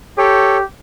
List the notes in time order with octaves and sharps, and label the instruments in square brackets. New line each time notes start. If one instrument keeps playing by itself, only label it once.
[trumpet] G4 [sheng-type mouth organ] A4 C#5